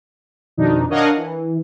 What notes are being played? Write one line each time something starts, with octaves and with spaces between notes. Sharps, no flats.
F2 B2 D#3 D4 D#4
D4 A#4 C#5 D#5 F5 F#5
E3